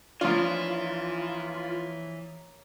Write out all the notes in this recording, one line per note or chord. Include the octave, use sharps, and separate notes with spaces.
E3 F3 A#3 D4 E4 F4 C#5